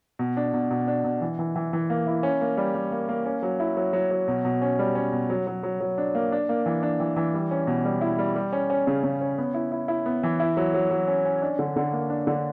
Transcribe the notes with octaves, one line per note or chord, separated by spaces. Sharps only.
B2
D4
B2
B2
D4
B2
E3
E3
E3
E3
A#3
E4
C#4
A#3
G3
G3
A#3
A#3
C#4
F#3
E4
F#3
F#3
F#3
B2
B2
C#4
G3
C#4
B2
F#3
F#3
F#3
F#3
D4
A#3
D4
A#3
E3
D4
E3
E3
G3
C#4
B2
G3
E4
G3
G3
C#4
C#4
C#3
C#3
C#4
B3
E4
E4
E4
B3
E3
E4
F#3
F#3
F#3
C#4
C#4
D4
D3
D3
A#3
D4
D3